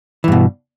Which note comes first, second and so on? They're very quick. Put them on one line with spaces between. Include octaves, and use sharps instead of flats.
E3 G2 B2